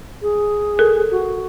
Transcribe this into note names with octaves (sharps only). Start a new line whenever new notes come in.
G#4
A4 A#4
F#4